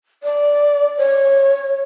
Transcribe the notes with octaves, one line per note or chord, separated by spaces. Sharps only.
D5
C#5